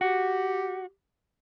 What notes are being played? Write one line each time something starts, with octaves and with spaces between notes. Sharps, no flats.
F#4 G4